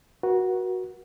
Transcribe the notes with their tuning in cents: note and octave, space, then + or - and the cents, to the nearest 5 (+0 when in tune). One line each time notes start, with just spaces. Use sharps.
F#4 +0 A#4 +45